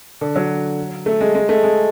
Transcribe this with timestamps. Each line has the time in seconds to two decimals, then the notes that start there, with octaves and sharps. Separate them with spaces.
0.21 D3
0.36 F#3
1.06 A3
1.21 G#3
1.35 G#3
1.49 A3
1.64 G#3